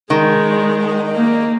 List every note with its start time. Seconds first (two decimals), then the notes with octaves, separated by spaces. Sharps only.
0.10 D#3 G#3
1.13 A#3